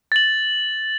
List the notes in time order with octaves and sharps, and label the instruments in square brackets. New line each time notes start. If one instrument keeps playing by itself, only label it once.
[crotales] A6 F#7